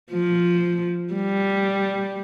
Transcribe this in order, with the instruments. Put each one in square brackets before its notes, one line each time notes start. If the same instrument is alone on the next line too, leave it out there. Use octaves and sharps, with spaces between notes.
[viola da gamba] F3
G3